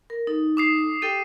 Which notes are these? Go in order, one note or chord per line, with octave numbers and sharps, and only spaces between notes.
A#4
D#4 A4
D6 D#6 C7
G4 A4 G5 D#7